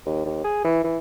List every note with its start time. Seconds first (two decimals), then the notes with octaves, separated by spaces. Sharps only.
0.06 D#2
0.26 D#2
0.44 G#4
0.64 E3
0.84 E3